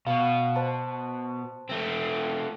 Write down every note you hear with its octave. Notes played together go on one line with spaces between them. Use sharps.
B2 F5
C5 A5
A3 C4